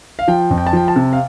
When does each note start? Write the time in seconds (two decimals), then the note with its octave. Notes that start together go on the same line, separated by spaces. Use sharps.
0.19 F5
0.28 F3 G5
0.51 F2
0.58 G5
0.67 A5
0.73 F3 G5
0.88 A5
0.96 C3
1.13 F5